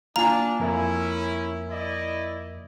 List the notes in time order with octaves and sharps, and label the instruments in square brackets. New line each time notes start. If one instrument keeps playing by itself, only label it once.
[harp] A#3 F4 G#5 [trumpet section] D4 [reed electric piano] F5 [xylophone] A#5
[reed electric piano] F2 A#4 E5 [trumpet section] C#4 E4
[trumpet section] E4 D5 D#5